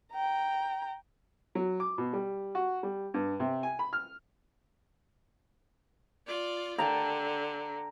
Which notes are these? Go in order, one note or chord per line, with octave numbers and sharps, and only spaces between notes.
G5 A#5
F#3
D6
B2
G3
F#4
G3
G2
C3
G#5
B5
F6
F4 D5
D3 G5 A5 A#5